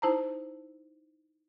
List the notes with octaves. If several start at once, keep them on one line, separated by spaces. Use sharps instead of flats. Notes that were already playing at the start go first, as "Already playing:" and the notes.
D#4 E4 C5 A5 A#5